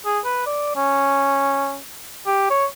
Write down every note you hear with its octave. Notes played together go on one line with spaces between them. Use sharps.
G#4
B4
D5
C#4
G4
C#5